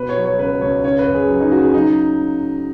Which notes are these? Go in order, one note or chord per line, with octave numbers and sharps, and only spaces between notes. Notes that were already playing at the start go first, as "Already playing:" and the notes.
Already playing: B2 B4
C#5
F#3
C#5
C#2 B4
C#2 C#5
C#3 C#5
B4
F#2
G#4
F#3
D#4
C#3 F#4
G#4
F#3 D#4